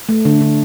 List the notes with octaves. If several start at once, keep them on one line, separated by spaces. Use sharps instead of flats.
A3
D3
D3